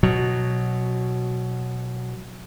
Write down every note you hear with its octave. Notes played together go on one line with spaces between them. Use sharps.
B2 F#3